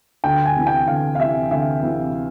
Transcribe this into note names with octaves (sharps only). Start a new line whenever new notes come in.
D2 G5
G#5
C3 E3
G5
D2 F5
F5
C3 E3 E5
D2 E5
C3 E3